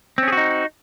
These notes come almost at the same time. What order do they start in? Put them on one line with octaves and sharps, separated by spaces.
C4 C#4 G#4 F#4 D#4